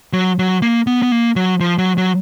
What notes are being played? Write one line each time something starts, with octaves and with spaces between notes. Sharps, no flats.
F#3
F#3
A#3
B3
B3
A#3
F#3
F3
F#3
F#3